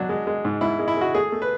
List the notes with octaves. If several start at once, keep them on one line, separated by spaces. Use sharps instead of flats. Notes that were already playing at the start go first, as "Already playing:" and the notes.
Already playing: F#3 D4
G#3
G#3
G#2
G#2 E4
G#3
E4
G#3 F#4
A3 G#4
A3
B4